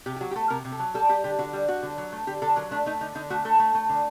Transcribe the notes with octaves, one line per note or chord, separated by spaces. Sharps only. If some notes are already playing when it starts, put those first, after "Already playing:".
C3 G4
G4
F#3 F#4
G4
A3 A4
C3 A#4
C3
A4
F#3
G3 A4
G3 G4
D3 G4
D3 F#4
G3
G3 F#4
D3
F#3
A3
D3 G4
D3 A4
F#3 A#4
A3 D4
A3 D#4
D3 D#4
D3 D#4
A3 F#4
A3 A4
A3
A3
D3